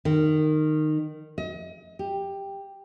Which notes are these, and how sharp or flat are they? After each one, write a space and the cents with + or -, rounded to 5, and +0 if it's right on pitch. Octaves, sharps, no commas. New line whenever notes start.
D#3 -15
D#5 +35
G4 +10